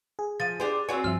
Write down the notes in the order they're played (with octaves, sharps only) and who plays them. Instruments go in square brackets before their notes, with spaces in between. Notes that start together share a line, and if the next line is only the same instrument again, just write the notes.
[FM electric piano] G#4
[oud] F3 [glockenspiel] A6 D#7
[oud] D4 G4 C5 [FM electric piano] G#4
[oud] C4 F#4 C#5 [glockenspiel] G#5
[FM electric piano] G2 F3 E5 [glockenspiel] F6